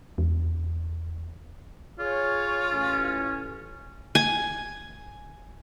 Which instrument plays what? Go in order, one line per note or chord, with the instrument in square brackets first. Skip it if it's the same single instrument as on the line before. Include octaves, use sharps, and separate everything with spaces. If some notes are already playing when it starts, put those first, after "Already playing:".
[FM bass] E2
[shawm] F4 [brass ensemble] G#4 C#5
[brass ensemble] A1 C#4
[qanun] G#5